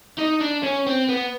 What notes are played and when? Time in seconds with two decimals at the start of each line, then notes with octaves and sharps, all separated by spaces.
0.18 D#4
0.41 D4
0.63 C#4
0.87 C4
1.09 B3